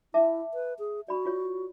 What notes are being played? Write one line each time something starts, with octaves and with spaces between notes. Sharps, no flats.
E4 E5 A5 D6
B4
G#4
F#4 D5 B5
F4 C#5